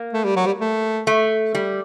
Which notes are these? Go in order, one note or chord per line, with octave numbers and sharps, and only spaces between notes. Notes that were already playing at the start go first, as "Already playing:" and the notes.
Already playing: A#3
A3
G3
F#3
G3
A3
A3
G3